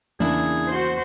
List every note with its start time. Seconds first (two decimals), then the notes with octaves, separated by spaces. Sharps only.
0.20 E2 C#3 A#3 D4 E4 G#4
0.68 F#4 C5